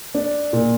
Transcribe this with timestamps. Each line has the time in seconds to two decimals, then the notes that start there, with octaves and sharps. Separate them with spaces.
0.14 D4
0.53 A#2